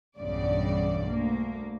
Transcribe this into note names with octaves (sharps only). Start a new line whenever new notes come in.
B1 E2 G2 C#3 D5
D2 A#3